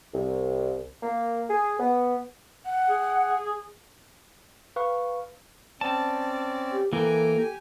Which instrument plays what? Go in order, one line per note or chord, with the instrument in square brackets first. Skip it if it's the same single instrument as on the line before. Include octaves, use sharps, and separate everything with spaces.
[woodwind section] C2
A#3
G#4
B3
[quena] F#5
[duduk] G#4
[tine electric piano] B4 F5 C#6
[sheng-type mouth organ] C4 C#4 D5 [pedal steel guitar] A5
[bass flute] G4
[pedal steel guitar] E3 A#3 [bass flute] A4 [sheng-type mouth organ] G5 G#5 A#5
[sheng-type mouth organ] G4 G#5